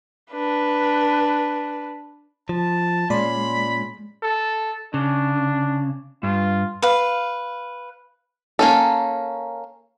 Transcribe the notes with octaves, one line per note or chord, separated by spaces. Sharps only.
D4 B4
F3 A5
A#2 G#3 C#4 D5 B5 C6
A4
C#3 D4
G2 F4
B4 F5
A#3 C#4 A4